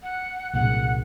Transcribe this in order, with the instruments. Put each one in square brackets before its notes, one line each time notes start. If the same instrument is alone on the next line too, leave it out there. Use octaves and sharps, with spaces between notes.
[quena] F#5
[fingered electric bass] C2 A#2 [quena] F#5